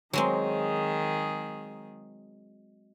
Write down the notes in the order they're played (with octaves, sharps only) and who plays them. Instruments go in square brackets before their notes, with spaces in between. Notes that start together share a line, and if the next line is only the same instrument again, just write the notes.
[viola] D#3 G#4 [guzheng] F#3 G#3 C4